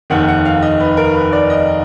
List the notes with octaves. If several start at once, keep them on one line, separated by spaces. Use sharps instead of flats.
F1 D#2 D#3 F#5
F#5
F5
D#5
B4
A#4
B4
D5
D#5